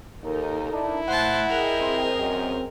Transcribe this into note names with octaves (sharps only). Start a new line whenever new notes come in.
D#2 D#4 A4 A#4
D4 E4
A2 C5 F#5 A5
G#4 A#4 D#5 G5
C4
F#2